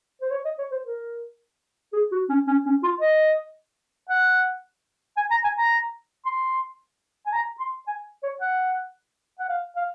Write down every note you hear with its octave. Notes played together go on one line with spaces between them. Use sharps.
C5
C#5
D#5
C#5
C5
A#4
G#4
F#4
C#4
C#4
C#4
F4
D#5
F#5
G#5
A#5
G#5
A#5
C6
G#5
A#5
C6
G#5
C#5
F#5
F#5
F5
F5